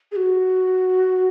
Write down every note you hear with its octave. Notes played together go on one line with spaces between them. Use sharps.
G#4
F#4